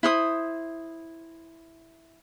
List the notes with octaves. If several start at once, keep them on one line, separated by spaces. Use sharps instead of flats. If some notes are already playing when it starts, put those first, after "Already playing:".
E4 C5 D#6